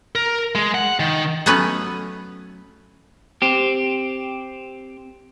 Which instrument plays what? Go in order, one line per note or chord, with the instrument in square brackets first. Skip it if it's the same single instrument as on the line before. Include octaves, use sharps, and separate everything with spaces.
[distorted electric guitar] A#4
G#3
F#5
D#3
[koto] F#3 A3 B3 C#4 B4
[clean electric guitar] C4 G4